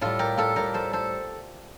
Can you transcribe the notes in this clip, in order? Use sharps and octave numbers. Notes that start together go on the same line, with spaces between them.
A2 G3 F4 A4
G4 A#4
F4 A4
A2 G3 G4 A#4
A4 C5
A4 C5